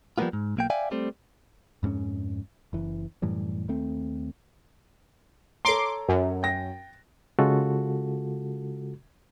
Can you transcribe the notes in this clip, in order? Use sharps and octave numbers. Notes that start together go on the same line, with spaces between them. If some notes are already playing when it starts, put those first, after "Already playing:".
F3 G3 G#3 A#3 B3 F4
G#2
B1 A#3 G5
D5 E5 F5 G5 G#5
G3 A3 C4
F2 G#2 C4 C#4
F#1 E3
F#2 A2 E3 G3
D#2 A3 C4
A4 C#5 A#5 C6 D6
F#2
G5 A#6
C#3 G#3 F4 F#4 A4